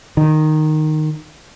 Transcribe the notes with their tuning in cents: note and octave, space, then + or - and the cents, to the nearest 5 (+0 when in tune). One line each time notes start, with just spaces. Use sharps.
D#3 -10